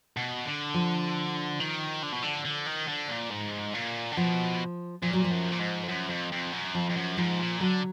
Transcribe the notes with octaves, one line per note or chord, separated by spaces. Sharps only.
B2
D3
F3
D#3
D3
B2
D3
D3
D#3
D3
A#2
G#2
A#2
D3
B2 F3
A#2 F3
F#3
F3
F#2
A#2
G#2
F2
F#2
F2
F2
F#2
F2 F3
F2
F#2
G#2 F3
A#2
D3 F#3